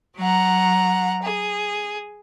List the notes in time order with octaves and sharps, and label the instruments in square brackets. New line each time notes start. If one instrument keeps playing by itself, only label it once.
[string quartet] F#3 F#5 A#5
G#4